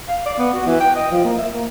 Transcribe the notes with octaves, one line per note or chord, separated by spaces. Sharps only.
F5
D5
B3
F#4
E3
G5
D#5
F3
A#3
E5
A#3